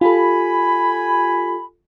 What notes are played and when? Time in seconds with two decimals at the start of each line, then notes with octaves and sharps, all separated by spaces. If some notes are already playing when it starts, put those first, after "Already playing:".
0.01 F4 G4 A4 G#5 B5